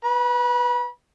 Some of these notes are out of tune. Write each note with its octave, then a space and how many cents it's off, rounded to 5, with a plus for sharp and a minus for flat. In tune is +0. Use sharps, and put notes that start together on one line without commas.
B4 +0 B5 -35